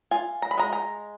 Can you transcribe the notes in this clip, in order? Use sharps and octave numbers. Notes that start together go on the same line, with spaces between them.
F4 G#5
A#5
B5
G#3 A#5
A#5